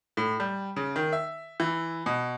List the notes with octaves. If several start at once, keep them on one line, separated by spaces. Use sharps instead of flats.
A2
G3
C#3
D#3
E5
E3
B2